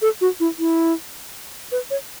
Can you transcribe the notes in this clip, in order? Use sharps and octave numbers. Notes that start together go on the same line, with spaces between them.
A4
F#4
E4
E4
B4
C#5